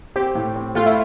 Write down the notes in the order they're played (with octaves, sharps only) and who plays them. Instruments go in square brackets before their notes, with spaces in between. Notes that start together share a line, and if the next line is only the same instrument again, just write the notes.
[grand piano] C4 [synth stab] G4
[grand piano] A2
C4
[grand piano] A3 [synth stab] F4
[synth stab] E4